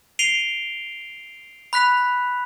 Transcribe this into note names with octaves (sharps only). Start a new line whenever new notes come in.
C7 D7 D#7 F7 G7
B5 F#6 B6 F7